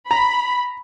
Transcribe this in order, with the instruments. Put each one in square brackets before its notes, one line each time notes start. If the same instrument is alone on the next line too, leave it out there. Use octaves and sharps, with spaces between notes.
[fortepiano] A#5 [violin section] B5